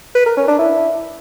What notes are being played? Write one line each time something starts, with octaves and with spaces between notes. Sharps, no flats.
B4
A#4
C#4
D4
E4